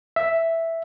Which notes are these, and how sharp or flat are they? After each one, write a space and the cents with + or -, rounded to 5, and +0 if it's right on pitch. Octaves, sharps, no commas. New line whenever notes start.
E5 +0